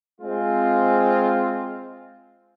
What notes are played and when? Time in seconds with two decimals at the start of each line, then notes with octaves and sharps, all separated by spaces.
0.21 G#3 C4 F4